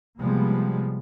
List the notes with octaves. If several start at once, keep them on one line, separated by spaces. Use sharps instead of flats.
C3 F3 G3 G#3 A#3 B3